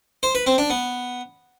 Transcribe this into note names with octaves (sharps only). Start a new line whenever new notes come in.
C5
B4
C4
D4
B3